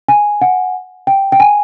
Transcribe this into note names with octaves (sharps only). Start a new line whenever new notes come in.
G#5
F#5
G5
G5
G#5